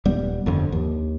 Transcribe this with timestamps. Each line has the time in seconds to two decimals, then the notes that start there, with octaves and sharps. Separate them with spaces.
0.05 D#1 G3 B3
0.46 G1 F2 D3
0.72 D#2